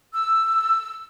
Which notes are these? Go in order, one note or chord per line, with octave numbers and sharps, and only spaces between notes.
E6